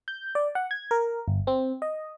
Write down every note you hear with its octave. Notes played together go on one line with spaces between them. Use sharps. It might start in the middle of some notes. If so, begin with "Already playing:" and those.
G6
D5
F#5
G#6
A#4
G1
C4
D#5